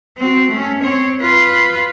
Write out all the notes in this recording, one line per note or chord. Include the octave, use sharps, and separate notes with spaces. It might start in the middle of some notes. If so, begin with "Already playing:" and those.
C4 F#4
A3 C#4
C4 C#5
F4 B4